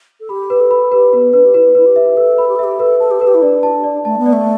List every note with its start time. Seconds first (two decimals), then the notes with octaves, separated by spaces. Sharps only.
0.20 A4
0.29 G4 B5
0.50 B4
0.60 A4
0.71 B5
0.92 G4 B4
1.13 B3 B4
1.33 D4 B4
1.45 G4
1.54 E4 B4
1.75 E4 B4
1.86 G4
1.96 E5
2.17 A4 B4
2.38 B5
2.48 G4
2.56 A4
2.59 G4 E5
2.79 A4 B4
3.00 A4 A5
3.11 G4
3.20 A4 B4
3.27 G4
3.34 E4
3.42 D4 D5
3.63 A5
3.84 D5
4.05 A3 A5
4.18 B3
4.26 D5
4.33 A3